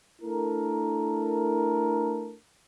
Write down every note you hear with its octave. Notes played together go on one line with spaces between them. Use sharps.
A3 D4 E4 A4 A#4